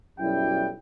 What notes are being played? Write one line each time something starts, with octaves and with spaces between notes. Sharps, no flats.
B1 F#2 G3 E4 G5